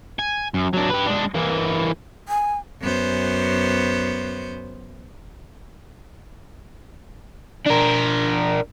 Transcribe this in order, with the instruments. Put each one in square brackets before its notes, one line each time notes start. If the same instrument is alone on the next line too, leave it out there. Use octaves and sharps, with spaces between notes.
[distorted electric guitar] G#5
F#2
F#3 D4
G4 B4
G#3 D4
E3 A#3
[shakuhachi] G#5
[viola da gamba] F#2 B3 C5
[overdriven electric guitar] D4 A#4